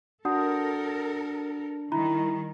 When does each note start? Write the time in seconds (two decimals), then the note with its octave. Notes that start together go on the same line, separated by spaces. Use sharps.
0.25 D4 F#4 A4 A#4 F#5 D#6
1.92 D#3 G3 E4 A#5